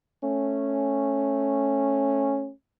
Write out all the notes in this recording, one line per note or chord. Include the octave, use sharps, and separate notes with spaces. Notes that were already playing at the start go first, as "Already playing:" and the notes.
A3 C#4